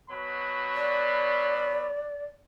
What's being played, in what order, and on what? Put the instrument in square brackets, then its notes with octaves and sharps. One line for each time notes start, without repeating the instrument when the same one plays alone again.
[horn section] B2 F#3 B5
[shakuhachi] D5